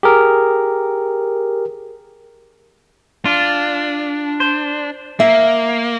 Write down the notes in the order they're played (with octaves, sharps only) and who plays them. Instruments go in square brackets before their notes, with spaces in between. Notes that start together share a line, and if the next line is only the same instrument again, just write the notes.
[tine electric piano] G4 G#4 A#4
[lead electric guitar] D4 [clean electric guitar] F4
[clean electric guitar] C5
[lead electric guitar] A#3 [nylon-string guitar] E5